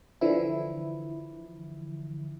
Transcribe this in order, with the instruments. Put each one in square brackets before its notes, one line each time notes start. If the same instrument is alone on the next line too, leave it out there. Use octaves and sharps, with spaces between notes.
[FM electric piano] D3 E3 F3 E4